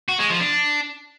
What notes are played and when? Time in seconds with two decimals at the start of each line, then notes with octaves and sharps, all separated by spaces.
0.08 F#4
0.19 G#3
0.30 F3
0.40 D4